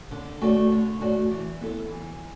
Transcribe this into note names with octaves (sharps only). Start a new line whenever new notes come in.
D3
A3 F#4 D5
D3
A3 F#4 D5
E3
B3 E4 A4
E3